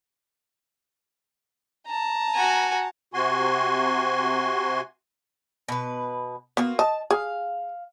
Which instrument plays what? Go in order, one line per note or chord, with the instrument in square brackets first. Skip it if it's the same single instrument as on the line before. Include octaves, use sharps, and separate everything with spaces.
[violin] A5 A#5
[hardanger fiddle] F#4 G#5
[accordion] C3 F#4 G#5 C6
[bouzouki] B2 B4
[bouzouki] A#3 F4 F#4 [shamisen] B3
[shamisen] D#5 [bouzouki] A5
[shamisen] G#4 [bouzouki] F5